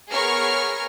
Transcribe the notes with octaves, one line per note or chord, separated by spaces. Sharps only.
B3 G#4 A#4 C#5 C#6 F6